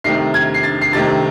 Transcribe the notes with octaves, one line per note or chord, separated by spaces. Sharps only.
C2 C3 D#3 A3 C7
G#6
C7
A6
C7
C2 C3 D#3 A3 A6